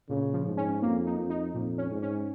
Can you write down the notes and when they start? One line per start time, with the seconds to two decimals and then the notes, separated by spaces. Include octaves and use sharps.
0.09 A#2 C#3
0.33 F3
0.46 G#2
0.57 C#4
0.82 F2 A#3
1.06 D#4
1.18 F2
1.30 D#4
1.54 F2 A#2
1.78 C#4
1.91 G#2
2.02 C#4